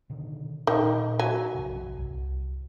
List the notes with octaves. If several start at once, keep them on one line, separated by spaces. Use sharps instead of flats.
B2 D3 D#3
A#2 D#3
F#3 G#5
A#1 G2 C3
C2